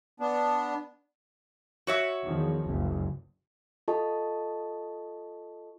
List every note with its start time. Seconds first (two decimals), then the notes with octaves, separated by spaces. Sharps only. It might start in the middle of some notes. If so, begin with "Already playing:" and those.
0.20 B3 D4
1.87 F#4 C#5 E5
2.24 E2 D#3 F3
2.65 F#1 C#2
3.88 F4 A4 D#5 A5 C#6